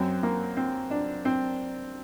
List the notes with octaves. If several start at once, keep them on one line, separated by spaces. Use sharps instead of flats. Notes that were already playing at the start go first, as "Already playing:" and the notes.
Already playing: F#2 F#3 C4
A#3
C4
D4
C4